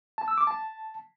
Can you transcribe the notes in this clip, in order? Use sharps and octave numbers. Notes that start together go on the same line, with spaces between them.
A5
E6
D6
A5